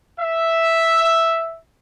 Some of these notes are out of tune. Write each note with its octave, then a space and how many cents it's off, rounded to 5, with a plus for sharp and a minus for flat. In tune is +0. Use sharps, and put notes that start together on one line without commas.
E5 +0